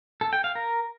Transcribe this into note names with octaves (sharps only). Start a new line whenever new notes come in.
A4
G5
F5
A#4